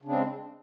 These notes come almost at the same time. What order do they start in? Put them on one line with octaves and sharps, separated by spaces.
C#3 D4 C4 G#3